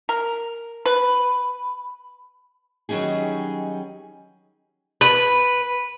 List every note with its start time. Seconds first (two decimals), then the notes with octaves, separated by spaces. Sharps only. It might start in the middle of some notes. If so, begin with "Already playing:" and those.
0.09 A#4
0.86 B4
2.89 D#3 F#3 G3 C#4 D#4 G#4
5.01 B4